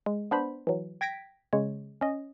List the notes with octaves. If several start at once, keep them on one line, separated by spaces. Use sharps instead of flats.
G#3
B3 D4 C5 B5
E3 F#3
G5 G#6 A#6 B6 D7
C#3 G#3 C#5
C#4 D#5